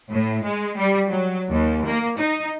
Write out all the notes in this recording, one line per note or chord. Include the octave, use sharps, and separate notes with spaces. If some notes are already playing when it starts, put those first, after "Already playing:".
A2
G#3
G3
F#3
D#2
A#3
D#4